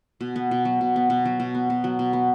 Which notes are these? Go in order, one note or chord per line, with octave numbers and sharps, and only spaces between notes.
B2
B3
B2
F#3
B2
B3
B2
F#3
B2
B3
B2
F#3
B2
B3